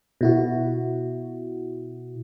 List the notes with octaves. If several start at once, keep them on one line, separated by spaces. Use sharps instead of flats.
B2 E4 F#4